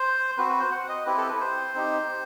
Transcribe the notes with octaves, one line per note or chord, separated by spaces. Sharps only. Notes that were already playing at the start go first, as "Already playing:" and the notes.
Already playing: C5
C4 F#4 B4
B4
C5
F#5
D#5
C4 E4 G4 B4
A4
B4
C5
C4 D#4 G4